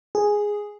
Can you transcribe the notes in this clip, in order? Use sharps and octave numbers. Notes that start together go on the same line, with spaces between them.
G#4